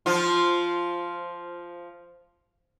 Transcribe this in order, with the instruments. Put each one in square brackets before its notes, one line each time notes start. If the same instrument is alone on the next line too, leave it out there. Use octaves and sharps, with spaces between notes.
[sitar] F3 F4